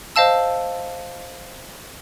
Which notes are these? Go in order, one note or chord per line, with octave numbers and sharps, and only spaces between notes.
C5 D#5 F5 A5 E6